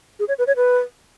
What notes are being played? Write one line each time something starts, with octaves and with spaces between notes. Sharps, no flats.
G#4
C#5
B4
C#5
B4